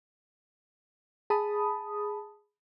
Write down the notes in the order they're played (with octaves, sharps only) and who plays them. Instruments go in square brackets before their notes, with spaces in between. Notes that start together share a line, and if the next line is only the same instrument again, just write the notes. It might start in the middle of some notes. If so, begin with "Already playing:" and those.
[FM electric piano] G#4 A5 B5 D#6